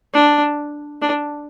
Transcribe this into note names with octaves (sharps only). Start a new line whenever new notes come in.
D4
D4